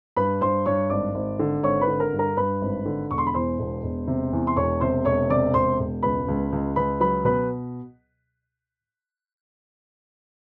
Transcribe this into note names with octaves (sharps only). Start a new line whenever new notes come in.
G2 B4 B5
G2 C5 C6
G2 C#5 C#6
G#1 D5 D6
G#1
D3
G#1 C#5 C#6
B4 B5
D3
A#4 A#5
G2
A#4 A#5
G2 B4 B5
G#1
D3
E1 C#6
C6
B5
E2 C5 C6
E1
E1
C3
E2
C6
E1 C#5 C#6
C3 C5 C6
E1 C#5 C#6
C3 D5 D6
E1 C5 C6
E1
C#2 B4 B5
C#2
C#2
C#2 B4 B5
F#3 B4 B5
B2 B4 B5